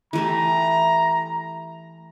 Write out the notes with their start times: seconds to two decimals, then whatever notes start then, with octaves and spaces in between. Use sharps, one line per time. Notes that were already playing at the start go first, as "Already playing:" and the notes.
0.13 E3 A3 G4 A#5